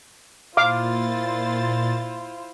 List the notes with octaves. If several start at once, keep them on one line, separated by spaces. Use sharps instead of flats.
A#2 E4 F4 C5 F5 D6 A6